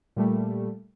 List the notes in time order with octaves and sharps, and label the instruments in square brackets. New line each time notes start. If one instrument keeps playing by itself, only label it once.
[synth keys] A#2 G3 A3